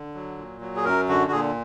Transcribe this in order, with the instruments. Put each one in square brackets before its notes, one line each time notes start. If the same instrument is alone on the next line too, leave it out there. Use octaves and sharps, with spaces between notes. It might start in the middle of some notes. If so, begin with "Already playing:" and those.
Already playing: [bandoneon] D3
F#3
A#2
F#3
G#4
F#2 A#4
D3 F#4
F#4
A#2 G#4